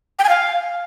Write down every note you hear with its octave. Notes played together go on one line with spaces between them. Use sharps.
G5
G#5
F5